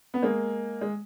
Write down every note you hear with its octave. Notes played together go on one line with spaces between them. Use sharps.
B3
G#3 A#3
G#3